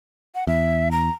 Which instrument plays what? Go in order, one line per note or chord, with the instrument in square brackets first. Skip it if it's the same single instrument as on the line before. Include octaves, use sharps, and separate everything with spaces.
[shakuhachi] F#5
[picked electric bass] E2 [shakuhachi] E5
[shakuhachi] A#5